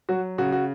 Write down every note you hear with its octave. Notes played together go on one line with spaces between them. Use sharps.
F#3 F#4
C#3 F#4
F#4